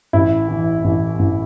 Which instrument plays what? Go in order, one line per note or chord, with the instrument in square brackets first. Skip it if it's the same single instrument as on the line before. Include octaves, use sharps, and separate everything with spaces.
[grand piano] A1 E4
E3
A1
A1